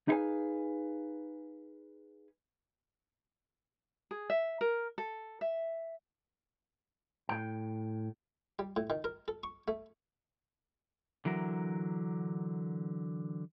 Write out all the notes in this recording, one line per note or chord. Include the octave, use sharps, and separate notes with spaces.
D#4 E4 G#4 B4 F5 G#5
G#4
E5
A#4
A4
E5
A2 G5
G3
A2
D#3
A#4
A4
C#6
A3
D3 E3 F#3 A#4